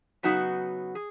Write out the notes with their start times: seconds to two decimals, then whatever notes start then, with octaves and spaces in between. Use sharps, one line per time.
0.23 C#3 F#3 B3 D#4 F#4
0.95 G#4